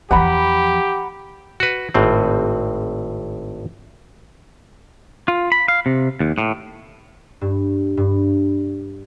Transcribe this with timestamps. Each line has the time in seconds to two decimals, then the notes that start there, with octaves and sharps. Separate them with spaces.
0.11 E2 F3 G4 F#5 A#5 B5
1.60 F#4 B4
1.94 G#1 A2 C4
5.28 F4
5.52 B5
5.68 F5
5.86 C3
6.20 D#2
6.38 A2
7.41 G2
7.97 G2